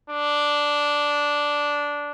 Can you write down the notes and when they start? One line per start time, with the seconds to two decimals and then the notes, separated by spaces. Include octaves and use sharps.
0.10 D4